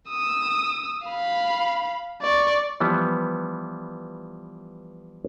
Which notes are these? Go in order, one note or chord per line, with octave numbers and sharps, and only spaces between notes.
D#6 E6
F5 B5
D5 C#6
E3 F3 G3 B3